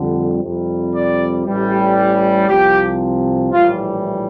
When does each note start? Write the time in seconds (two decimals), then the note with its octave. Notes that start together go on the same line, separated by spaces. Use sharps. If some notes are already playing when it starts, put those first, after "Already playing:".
Already playing: F2 D3 G3
0.42 F2 C3 G3
0.94 D5
1.45 A1 A2 E3 G3
2.48 C2 C3 F3 G4
3.52 A#1 A2 E3 G3 F4